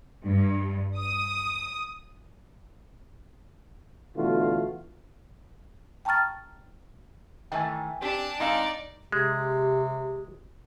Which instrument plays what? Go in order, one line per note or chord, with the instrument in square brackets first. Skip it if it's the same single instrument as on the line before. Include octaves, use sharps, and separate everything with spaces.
[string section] G2
D#6
[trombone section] B2 D3 E3 A3 F4 F#4
[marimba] G5 A5 A#5 C#6 F6 A6
[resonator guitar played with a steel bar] D#3 E3 A3 [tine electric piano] G5 G#5
[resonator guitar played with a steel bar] C4 [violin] D4 A5 [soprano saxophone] G4
[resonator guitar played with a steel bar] G#3 C4 F5 [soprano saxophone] D#4 [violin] D5
[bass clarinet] C3 [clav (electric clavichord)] G#3 [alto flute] G4